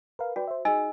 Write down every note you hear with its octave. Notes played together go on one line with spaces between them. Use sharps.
A#4 B4 F5
F#4 B4 D5 G5
C5 E5
D#4 G#4 D#5 G#5 E6